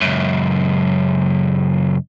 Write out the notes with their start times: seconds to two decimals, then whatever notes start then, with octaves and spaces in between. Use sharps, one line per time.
0.02 C#2 F#2